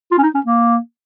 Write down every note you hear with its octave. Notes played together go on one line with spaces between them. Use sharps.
F4
C#4
D#4
C#4
A#3